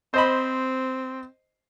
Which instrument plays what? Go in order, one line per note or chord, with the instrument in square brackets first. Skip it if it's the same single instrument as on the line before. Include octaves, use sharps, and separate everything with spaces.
[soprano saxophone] C4 [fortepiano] C5 D#5 B5